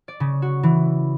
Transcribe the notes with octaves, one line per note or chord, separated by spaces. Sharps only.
D5
C#3
F#4
E3